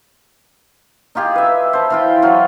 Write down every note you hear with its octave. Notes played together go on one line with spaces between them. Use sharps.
D#4 F4 G4 G#4
B4 E5
C5 A5
E3 F4 G5
F#3 F4 C5